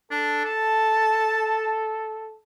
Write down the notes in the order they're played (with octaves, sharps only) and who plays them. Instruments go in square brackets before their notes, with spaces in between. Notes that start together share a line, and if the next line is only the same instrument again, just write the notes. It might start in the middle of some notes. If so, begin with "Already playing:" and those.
[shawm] D4 [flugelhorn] A4
[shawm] A5